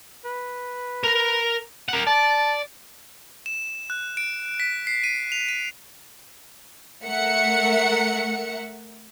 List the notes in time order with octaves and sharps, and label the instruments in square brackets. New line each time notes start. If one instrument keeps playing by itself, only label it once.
[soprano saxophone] B4
[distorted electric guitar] A#4 A#5
A#4 F#5
[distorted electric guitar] D5 [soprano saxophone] A5
[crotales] E7
F#6
D7
B6
C7
D#7
F7
D#7
[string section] A3 A#4 E5 F#5 C#7